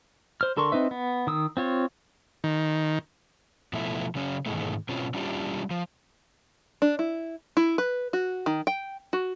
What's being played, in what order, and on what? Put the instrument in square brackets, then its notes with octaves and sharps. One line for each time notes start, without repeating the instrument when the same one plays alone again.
[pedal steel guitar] C5 F6
D3 A4 A#4 C6 C#6
C4 D#4 B4 E5
B3
D#3 D#6 E6
C4 F4 C#5
[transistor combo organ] D#3
[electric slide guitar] B2 F3 A3 E4
C#3 F#3 C#4
G#2 B2 D#3 E3 G#3 A3
B2 C4 C#4 F4
G3 C#4 D4 E4 F4 G4
F3
[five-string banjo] D4
E4
E4
B4
F#4
D#3
G5
F#4